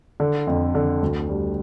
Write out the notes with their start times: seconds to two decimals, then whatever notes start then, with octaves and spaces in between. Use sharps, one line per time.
0.20 D3
0.47 F2
0.75 D3
1.02 D2
1.29 G3